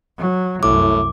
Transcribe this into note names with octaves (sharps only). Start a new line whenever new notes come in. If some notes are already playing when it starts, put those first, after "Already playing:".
F#3
C2 F#2 A2 D6